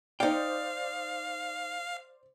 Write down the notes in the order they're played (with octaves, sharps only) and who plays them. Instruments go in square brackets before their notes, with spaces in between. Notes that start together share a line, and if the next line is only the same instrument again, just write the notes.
[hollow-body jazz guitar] D#4 G5 [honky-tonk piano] C5 D5 [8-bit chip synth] F5